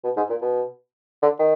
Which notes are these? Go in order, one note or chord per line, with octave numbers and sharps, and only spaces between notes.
B2
G#2
A#2
B2
D3
D#3